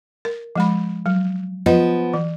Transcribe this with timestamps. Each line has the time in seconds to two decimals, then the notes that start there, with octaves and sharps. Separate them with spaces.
0.25 A#4
0.56 F3 G#3 B5
1.06 F#3
1.66 F3 B3 D#5
2.14 E3